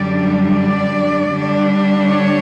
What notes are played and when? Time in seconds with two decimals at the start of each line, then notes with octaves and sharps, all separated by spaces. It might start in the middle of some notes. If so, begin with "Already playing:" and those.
Already playing: F#2 D3 G3 D4 D5
0.54 D5
1.29 D3 G3 D4
2.05 C#5